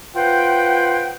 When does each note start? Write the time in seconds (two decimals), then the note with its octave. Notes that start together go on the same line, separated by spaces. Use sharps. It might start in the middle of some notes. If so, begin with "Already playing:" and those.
0.15 F4 B4 C5 F#5 G5